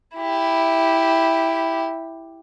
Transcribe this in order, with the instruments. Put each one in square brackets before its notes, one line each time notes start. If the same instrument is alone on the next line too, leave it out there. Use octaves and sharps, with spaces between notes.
[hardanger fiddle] E4 G4